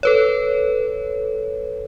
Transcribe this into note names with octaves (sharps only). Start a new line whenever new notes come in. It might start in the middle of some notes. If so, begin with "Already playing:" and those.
A4 B4 C#5